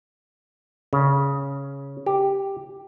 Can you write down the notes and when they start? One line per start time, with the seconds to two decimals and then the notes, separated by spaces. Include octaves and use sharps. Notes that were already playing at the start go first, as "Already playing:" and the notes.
0.93 C#3
2.06 G4